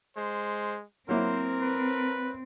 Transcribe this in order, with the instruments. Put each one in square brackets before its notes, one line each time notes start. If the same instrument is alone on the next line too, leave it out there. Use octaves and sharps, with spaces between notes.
[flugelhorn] G#3 [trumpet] C5
[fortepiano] F#3 A#3 E4 [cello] C4 [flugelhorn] A#4 [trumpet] C5
[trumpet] B4